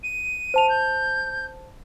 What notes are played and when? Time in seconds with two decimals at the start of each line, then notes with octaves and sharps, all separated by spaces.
0.03 D#7
0.54 C5 A5 F7
0.69 G6